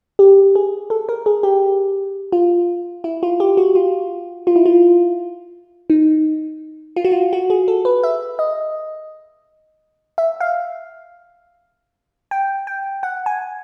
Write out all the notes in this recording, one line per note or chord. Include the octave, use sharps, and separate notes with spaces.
G4
G#4
A4
A#4
G#4
G4
F4
E4
F4
G4
F#4
F4
F4
E4
F4
D#4
F4
F#4
F4
F#4
G#4
A4
B4
E5
D#5
E5
F5
G5
G5
F#5
G#5